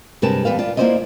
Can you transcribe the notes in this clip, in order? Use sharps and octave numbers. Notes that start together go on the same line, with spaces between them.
G2 C3 G#3 A#4 B4 A5
E2 G3 B4 F5
F4 D5
A#3 E4 F4 C5 D5 D#5